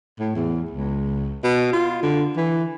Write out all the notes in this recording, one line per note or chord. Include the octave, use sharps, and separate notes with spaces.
A2
E2
C#2
B2
F4
D3
E3